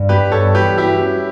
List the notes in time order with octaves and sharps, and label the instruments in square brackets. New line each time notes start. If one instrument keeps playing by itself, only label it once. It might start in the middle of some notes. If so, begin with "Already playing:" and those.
Already playing: [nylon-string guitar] G2
[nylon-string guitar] B3 [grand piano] G4 B4
[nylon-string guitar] G2 [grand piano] A4 C#5
[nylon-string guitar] E3 [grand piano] G4 B4
[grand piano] E4 G4 [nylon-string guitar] F#4
[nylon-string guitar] C#4